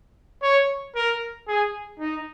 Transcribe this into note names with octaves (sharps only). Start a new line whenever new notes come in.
C#5
A#4
G#4
D#4